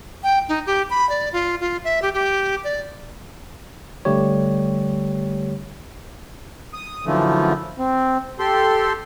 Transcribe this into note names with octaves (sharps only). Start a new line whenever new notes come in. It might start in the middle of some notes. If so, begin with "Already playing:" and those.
G5
D#4
G4
B5
D5
F4
F4
E5
G4
G4
D5
D3 G3 A3 G4 C#5
D#6
F#2 D3 E3 F3 A3
C4
G4 A4 C6